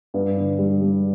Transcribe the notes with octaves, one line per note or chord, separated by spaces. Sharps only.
G2
D3
G3
G3